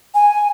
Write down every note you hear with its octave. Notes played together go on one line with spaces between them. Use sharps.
G#5